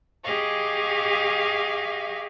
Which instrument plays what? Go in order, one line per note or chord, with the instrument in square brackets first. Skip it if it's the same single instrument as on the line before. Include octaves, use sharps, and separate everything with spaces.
[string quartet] G4 G#4 D#5 F5 C#6